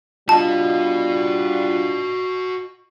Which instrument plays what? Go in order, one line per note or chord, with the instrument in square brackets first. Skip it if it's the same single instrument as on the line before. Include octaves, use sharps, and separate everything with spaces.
[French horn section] G3 D4 F4 [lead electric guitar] F#4 D#5 [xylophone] A5